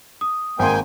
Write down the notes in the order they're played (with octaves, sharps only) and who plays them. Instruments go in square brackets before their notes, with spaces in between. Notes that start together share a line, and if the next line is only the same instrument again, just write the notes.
[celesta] D#6
[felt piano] G#1 C6 [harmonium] A#3 G5 G#5